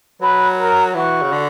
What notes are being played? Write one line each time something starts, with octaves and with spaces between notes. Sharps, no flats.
F#3 B4
A#4
E3 F#4
C#3
D3